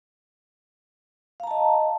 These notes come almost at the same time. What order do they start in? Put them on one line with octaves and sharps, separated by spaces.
F5 A#5 A5 D#5